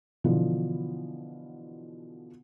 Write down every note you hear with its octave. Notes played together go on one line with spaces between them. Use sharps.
B2 D3 E3 F3